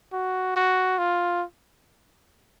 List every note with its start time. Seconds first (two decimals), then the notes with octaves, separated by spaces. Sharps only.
0.13 F#4
0.56 F#4
0.98 F4